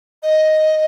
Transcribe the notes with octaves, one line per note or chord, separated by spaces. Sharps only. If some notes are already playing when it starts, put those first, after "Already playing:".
D#5